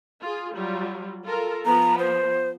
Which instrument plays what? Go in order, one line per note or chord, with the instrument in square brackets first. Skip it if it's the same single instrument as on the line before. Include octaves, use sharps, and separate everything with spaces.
[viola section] F4 G#4
F#3 G3 F4
F4 A4 A#4
[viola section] F3 B3 [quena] A#5
[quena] C5